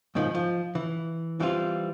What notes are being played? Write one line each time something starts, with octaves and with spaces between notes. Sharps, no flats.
G#2 B2 D#3 F3
F3
E3
E3 G3 C4 F4